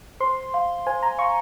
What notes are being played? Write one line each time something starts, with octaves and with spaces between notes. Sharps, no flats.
C5 C6
F5 C6
C5 G#5
A#5
F5 C6 C#6